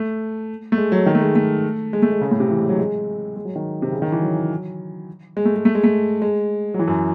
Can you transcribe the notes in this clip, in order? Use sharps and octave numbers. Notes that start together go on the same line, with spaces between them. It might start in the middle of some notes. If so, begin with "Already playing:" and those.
Already playing: A3
A3
G#3
F#3
D#3
A3
G#3
A3
G#3
A3
G#3
C#3
A2
C3
E3
G#3
F#3
G#3
G#3
F#3
D#3
C3
C#3
D#3
E3
F#3
G#3
A3
G#3
A3
G#3
A3
G#3
F#3
E3
F#2